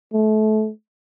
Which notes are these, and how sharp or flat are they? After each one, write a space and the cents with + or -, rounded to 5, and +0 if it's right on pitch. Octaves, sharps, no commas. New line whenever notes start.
A3 -30